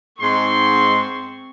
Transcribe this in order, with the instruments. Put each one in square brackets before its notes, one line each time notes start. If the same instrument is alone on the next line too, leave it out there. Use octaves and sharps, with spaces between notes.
[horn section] G#2 C6 [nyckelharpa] C4 C#6